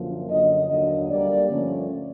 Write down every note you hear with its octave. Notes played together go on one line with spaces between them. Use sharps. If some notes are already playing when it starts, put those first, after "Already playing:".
Already playing: F#2 D3 F3 A#3
F#2 D3 F#3 D#5
D#2 D3 F#3 A#3 D4 D#5
D2 D3 G3 A#3 D5
G2 D3 F3 A3 C#4